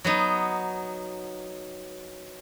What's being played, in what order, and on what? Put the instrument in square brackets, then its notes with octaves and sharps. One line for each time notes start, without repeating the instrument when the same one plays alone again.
[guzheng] F#3 B3 D#4